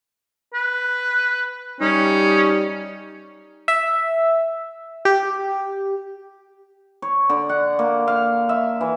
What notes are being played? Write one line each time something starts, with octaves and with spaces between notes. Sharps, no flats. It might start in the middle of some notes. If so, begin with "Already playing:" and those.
B4
G3 C#4 D#4
E5
G4
C#5
D3
F#5
A#3
F5
E5
E3